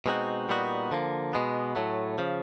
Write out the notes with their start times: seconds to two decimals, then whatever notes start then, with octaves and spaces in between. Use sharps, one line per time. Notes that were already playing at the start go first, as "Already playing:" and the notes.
0.06 B2 G#3 C4 D#4 F#4
0.49 A#2 G3 B3 D#4 F#4
0.91 D3 F3 A#3
1.33 B2 G#3 B3
1.76 A2 F#3 A3
2.18 C#3 F3